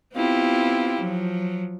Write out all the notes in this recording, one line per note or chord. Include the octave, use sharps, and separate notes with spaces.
B3 C4 E4 F4 G4
F3 F#3